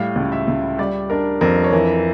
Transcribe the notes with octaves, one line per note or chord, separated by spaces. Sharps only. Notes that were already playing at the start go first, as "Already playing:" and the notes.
Already playing: A2 G3 F5
C#2
E5
C#2
G3 D5
D4 A#4
F2 A#4
C#5
E3 A#4